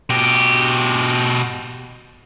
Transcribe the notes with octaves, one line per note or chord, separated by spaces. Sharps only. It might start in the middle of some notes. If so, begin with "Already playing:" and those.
B2 G4